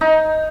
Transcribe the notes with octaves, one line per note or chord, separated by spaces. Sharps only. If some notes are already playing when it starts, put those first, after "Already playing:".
D#4